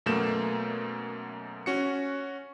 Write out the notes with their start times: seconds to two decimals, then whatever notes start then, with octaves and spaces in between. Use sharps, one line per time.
0.06 F#2 B2 A3 A#3 G6 E7
1.66 C#4 F#4 C#7